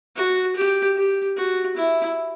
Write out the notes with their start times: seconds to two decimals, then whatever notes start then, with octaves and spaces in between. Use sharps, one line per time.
0.16 F#4
0.56 G4
0.96 G4
1.36 F#4
1.76 E4